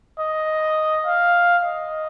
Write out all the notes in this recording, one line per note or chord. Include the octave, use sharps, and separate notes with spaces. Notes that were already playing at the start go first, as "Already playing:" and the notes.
D#5
F5
D#5